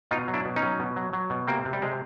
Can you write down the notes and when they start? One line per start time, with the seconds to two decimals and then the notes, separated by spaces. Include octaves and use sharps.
0.11 B2 D#4 F4
0.28 F#3
0.34 D4 E4
0.45 B2
0.56 C#4 D#4
0.62 F#3
0.79 B2
0.96 F#3
1.13 F#3
1.30 B2
1.47 C3 A#3 C4
1.65 C3
1.73 G3
1.82 C3 G#3